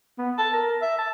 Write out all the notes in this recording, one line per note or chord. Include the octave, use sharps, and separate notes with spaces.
B3
A5
A#4
E5
A5